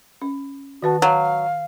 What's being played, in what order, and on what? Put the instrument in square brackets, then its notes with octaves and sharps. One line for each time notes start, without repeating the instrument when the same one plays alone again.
[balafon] C#4
[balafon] D#3 B4 A5 [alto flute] F#4
[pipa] F#3 [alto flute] F5